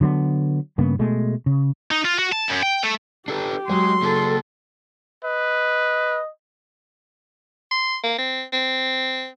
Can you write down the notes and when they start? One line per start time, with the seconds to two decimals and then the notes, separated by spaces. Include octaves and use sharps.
0.01 D3 F#3 G#3 B3
0.78 G2 C#3 A#3 B3
0.99 B2 G#3 A3
1.46 C#3
1.91 D#4
2.05 F4
2.19 F#4
2.33 A5
2.48 F#2
2.63 G5
2.83 A3
3.28 D4 G4 A4 B4
3.69 F#3 G#3 C6
4.02 C#3 A#3 G#4 A4
5.24 B4 D#5
7.71 C6
8.04 A#3
8.19 C4
8.53 C4